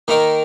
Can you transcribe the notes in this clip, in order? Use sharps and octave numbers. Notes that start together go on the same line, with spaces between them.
D#3 A#3 D#4 A#4